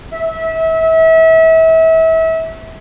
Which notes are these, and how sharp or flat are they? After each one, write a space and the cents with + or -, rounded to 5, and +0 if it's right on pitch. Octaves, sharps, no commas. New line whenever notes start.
E5 -30